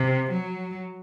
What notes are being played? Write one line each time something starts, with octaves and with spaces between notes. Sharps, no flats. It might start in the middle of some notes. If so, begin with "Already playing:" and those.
Already playing: C3
F#3